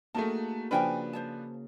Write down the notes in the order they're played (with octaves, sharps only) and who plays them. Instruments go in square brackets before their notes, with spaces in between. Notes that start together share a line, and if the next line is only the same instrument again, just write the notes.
[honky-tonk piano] A3 A5 [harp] A#3 F#4 G#4 [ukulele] D#4 A#4
[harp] C#3 [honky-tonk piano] F3 D4 B4 [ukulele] A#4 G5 G#5
[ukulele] C5 C#5 A5